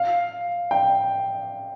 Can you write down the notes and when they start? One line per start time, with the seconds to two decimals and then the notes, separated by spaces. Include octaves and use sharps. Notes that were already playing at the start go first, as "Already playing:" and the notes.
Already playing: F5
0.71 G5